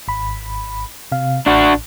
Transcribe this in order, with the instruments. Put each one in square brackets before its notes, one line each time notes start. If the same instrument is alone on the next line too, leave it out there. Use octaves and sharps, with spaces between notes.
[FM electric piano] G#1 B5
C3 F5
[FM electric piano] A1 [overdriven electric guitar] D4 F#4